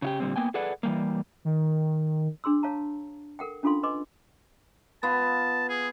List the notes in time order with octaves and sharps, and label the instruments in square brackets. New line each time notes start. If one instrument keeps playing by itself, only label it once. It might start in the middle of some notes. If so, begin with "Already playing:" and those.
[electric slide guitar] C#3 F4 G4
A#2 D3 G3 C4
A#3 B3 G5 G#5
G#4 A4 B4 D5 F#5
E3 G3 A#3
[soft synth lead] D#3
[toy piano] D4 G#4 C6 E6
C#5 F5 A5 A#5
A4 A#4 F#5 G5
C#4 D4 F4 A4 F5 C6
B4 D#5 G#5 C6 D6
[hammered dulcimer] B3 F4 [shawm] A5
[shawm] G#4